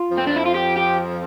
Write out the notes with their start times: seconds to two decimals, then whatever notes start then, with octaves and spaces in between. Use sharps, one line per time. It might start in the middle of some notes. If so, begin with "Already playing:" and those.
Already playing: F4
0.11 F2 F3
0.17 C4
0.27 D4
0.36 E4
0.45 F4
0.54 G4
0.76 G4